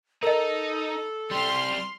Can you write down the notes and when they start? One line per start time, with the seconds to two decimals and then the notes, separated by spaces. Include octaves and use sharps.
0.23 D#4 A4 A#4 D#5
1.31 G3 C4 C6 F6